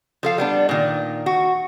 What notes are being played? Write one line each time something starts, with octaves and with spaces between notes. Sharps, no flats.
F3 A4 F5
G3 B3 D4
A#2 D#3
F#4